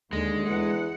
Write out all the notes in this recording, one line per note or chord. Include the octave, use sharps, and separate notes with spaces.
D#2 D3 G#3
E2 F#5